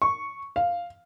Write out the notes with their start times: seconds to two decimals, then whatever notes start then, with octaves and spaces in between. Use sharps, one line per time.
0.02 C#6
0.56 F5